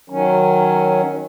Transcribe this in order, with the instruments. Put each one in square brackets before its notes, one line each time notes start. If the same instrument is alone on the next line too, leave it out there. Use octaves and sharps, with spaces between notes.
[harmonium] D#3 F#3 C#4